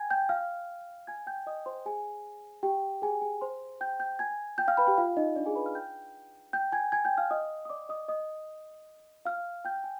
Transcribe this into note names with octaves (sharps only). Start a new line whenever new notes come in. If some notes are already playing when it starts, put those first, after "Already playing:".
Already playing: G5 G#5 G#6
G5 G6
F5 F6
G#5 G#6
G5 G6
D#5 D#6
C5 C6
G#4 G#5
G4 G5
G#4 G#5
G#4 G#5
C5 C6
G5 G6
G5 G6
G#5 G#6
G5 G6
F5 F6
B4 B5
G4 G5
F4 F5
D#4 D#5
D4 D5
G#4 G#5
B4 B5
F5 F6
G5 G6
G5 G6
G#5 G#6
G#5 G#6
G5 G6
F5 F6
D#5 D#6
D#6
D5 D6
D#5 D#6
D#5 D#6
F5 F6
G5 G6
G#5